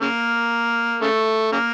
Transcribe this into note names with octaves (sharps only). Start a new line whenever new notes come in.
C#3 A#3
C#3 A3
C#3 A#3